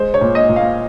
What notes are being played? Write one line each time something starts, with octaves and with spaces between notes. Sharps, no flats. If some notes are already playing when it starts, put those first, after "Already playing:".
Already playing: G#3 C5
C#5
A#2
D#5
A#2
F5